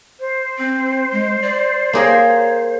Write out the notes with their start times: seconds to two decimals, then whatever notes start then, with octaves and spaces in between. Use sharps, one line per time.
0.20 C5
0.58 C4
1.12 G#3
1.42 D5
1.93 A#3 G#4 A#4 C#5